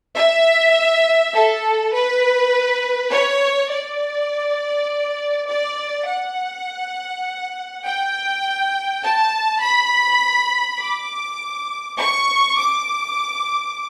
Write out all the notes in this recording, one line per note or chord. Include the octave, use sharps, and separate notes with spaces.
E5
A4
B4
C#5
D5
D5
F#5
G5
A5
B5
D6
C#6
D6